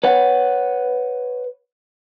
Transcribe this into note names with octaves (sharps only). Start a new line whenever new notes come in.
B4 C#5 F#5